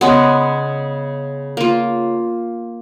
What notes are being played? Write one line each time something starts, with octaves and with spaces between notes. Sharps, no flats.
C#3 G#3 B3
A#3 F4